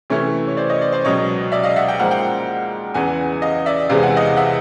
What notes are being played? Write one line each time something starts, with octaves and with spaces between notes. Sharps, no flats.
C3 E3 A3 C#4 E4 C#5
C#5
C5 D5
C#5 D#5
C5 D5
C5 D5
C#2 B2 F#3 C#5 D#5
D5 E5
D#5 F5
E5 F#5
G5
G#2 F3 A#3 F#5
F5 G5
E2 C#3 E3 F#5 G#5
D#5 F5
D5 E5
E2 C3 E3 G#3 C4 F5
F#5
D#5 F5
E5 F#5